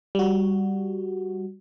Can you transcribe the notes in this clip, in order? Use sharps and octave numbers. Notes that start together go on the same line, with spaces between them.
G3 F#4